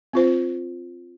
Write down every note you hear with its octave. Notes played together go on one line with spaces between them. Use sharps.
C4 F4 C5